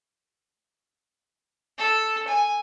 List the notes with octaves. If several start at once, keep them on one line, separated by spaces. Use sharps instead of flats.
A4
G#5